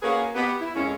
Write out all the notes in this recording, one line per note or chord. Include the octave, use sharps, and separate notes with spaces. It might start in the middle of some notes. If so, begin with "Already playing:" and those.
A#3 C#4 F#4 G#4 A#4 B4
B3 G4
E4
F2 G#3 A#3 C#4